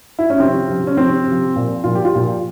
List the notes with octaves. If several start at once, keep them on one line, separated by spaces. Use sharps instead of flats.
E4
C#4
C3 C4
F3
C3 F3
C#4
C3 F3 C4
C3 F3
A#2 F3
A#2 F3 F4
G4
F4
A#2 F3